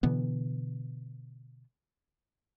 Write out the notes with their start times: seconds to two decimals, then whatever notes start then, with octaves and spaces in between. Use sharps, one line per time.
0.03 B2 D3 E3 B3